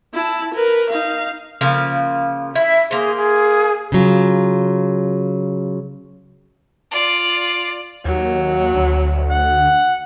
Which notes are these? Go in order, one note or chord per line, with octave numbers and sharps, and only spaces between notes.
E4 A5
A#4 B4
D#4 F5
C#3 F3 A#3
E4 E5
A#3 G#4 C5
G#4
C#3 F#3 F4
F4 D5
D#2 F#3
D2
F#5